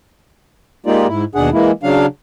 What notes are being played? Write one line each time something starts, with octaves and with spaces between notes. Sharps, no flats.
G#3 A#3 D#4 F4 G4 D5
G#2 E4
D#2 B2 D4 G#4 F#5
E3 G#3 A#3 E4
C#3 F#3 D4 F5